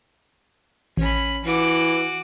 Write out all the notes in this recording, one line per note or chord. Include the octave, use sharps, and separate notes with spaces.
A1 C#4 B5
E3 F#4 D6